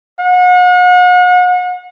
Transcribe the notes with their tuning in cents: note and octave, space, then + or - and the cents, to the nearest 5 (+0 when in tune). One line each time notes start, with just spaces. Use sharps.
F#5 -40